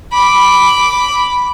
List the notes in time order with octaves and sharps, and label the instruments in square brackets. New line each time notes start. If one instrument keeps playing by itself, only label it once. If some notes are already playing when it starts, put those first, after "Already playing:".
[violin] B5 D6